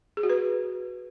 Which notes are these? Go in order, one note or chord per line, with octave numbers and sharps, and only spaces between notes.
G#4
F#4
B4